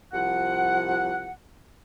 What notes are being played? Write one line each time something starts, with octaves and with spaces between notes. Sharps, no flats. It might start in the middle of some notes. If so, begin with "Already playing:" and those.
C2 F3 F#5